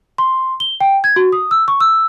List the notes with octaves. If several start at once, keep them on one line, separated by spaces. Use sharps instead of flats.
C6
G7
G5
G#6
F#4
D#6
E6
C#6
E6